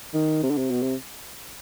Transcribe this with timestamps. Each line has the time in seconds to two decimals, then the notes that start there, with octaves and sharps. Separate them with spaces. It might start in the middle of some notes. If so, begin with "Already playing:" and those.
0.14 D#3
0.43 C3
0.50 D3
0.58 C3
0.70 B2
0.82 C3